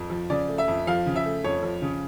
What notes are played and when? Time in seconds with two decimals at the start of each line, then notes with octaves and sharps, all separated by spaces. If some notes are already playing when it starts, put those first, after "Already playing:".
Already playing: F2
0.10 F3
0.30 C#3 D5
0.48 A3
0.58 E5
0.68 F2
0.87 F3 F5
1.06 C#3
1.16 E5
1.24 A3
1.44 F2 C#5
1.63 F3
1.82 C#3